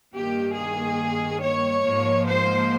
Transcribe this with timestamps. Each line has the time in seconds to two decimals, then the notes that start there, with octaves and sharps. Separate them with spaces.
0.14 G2 D#3 A#3 G4
0.57 G#4
1.41 C#5
1.84 G#2 F3 A#3
2.27 C5